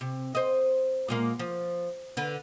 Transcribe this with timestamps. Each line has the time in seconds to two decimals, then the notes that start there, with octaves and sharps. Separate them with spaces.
0.01 C3
0.35 C5 D#5
1.08 A#2 G#3 A#3
1.39 F3
2.17 D3 B4